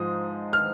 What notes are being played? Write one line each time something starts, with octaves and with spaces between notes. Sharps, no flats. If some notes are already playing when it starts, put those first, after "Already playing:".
Already playing: G#2 F3 G#3 D#6
F6